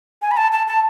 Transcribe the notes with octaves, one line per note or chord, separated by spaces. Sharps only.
G#5
B5
A5
A5
A5